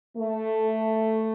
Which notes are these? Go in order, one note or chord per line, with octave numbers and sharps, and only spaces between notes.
A3